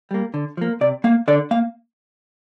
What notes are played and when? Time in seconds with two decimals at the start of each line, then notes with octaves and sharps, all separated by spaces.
0.11 G3 A#3
0.34 D3
0.57 F3 A#3
0.81 C3 D5
1.04 A#3 F5
1.28 D3 D5
1.51 A#3 F5